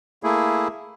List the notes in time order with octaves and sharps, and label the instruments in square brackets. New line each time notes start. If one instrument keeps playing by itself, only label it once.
[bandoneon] A3 A#3 E4 G#4